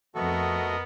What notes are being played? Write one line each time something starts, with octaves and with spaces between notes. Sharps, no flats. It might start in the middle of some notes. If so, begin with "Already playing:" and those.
F2 A3 B3 F#4 A4 A#4 D#5